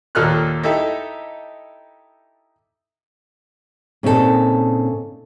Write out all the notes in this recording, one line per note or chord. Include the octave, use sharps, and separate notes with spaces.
D#2 A#2 A4 D#5 F6 F#6
D#4 E4 G4 A4 E5
A#2 C#3 C4 D#4 F#4 A4